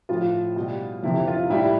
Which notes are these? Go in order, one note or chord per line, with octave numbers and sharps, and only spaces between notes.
A2 F3 F4
B2 G3
F2 C3 E3 E4
F4
A2 G3 E4